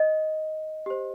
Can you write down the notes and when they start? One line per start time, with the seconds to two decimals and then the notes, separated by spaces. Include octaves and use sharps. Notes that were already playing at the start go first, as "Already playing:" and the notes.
Already playing: D#5
0.86 G4 C5